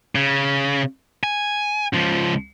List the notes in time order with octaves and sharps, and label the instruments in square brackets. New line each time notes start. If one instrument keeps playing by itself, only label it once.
[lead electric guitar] C#3
G#5
C#2 F3